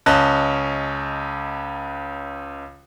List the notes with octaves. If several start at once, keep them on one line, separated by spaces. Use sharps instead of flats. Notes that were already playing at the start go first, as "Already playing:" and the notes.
C#2 C#4 D#5 A5 F#6